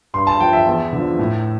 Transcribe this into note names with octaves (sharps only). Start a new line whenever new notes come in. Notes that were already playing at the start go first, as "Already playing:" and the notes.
G2 C6
A5
F3 G5
E5
E2
D3 F3
A2